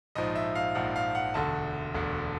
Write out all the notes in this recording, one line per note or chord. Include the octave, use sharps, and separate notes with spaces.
A#1 G#2 F3 D#5
E5
F5
A#1 G#2 F3 F#5
F5
F#5
E1 D2 D3 A5
E1 D2 D3